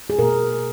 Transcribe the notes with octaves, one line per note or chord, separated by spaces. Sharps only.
G#4
B2 A#3 A#4